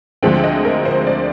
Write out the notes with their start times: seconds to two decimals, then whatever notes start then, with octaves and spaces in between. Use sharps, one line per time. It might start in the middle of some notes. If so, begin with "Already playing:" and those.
0.23 D2 D3 F3 G#3 C4 G5
0.43 D#5
0.65 A#4
0.85 C5
1.07 D5